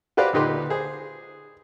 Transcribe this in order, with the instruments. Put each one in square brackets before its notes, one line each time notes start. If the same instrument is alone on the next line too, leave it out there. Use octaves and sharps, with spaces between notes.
[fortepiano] F#4 G4 B4 C5 D5 F5
D2 A#2 D#4 G4 B4 C6
G#4 C5